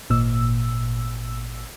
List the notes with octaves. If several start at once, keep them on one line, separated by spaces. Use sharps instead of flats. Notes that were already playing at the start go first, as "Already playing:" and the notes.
G#1 A#2 E6